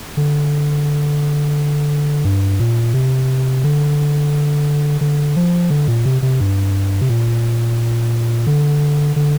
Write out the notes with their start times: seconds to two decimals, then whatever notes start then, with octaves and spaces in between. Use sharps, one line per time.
0.17 D3
2.25 G2
2.60 A#2
2.94 C3
3.64 D3
5.01 D3
5.36 F3
5.70 D3
5.88 A#2
6.05 C3
6.22 C3
6.40 G2
7.01 C3
7.10 A#2
8.47 D3
9.16 D3